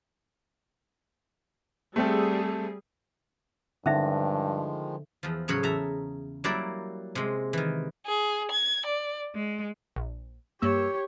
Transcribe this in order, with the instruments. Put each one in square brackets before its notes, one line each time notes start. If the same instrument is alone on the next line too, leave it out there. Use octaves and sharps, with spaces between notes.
[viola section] G3 G#4 [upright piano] A3 C4 A4
[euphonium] G2 [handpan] D3 [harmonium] D#3 F3 G#3 [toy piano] C#4 D#4 E5
[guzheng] E2 F3
A2 C#3 F#3 C#5 B5
E2 E5 A5 A#5
F#3 G3 A#3 E4 D5
C3 G#3
D#3 E3
[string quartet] G#4
G#6
D5
G#3
[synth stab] A#1
[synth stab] G2 A#3 E6 [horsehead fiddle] G4 C#5